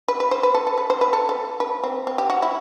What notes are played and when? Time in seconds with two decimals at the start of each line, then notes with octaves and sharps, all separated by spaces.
0.08 B4
0.20 B4
0.31 C5
0.43 B4
0.54 A4
0.67 A4
0.78 B4
0.90 C5
1.01 B4
1.13 A4
1.29 A4
1.60 B4
1.84 C4
2.07 C4
2.18 G4
2.30 F#4
2.42 E4